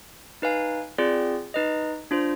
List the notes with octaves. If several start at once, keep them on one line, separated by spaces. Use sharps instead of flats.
D#4 B4 F5 G#5
C4 F4 G#4 D5
D#4 B4 D#5
D4 F4 C5